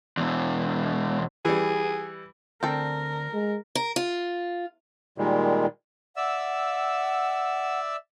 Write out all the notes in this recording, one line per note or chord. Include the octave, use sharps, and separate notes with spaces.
E2 B2
E3 G3 G#4
D2 C4 D4 A4 A#4 G5
G#3
A#4
F4
A#2 D#3 G3 G#3
D5 E5 F#5 E6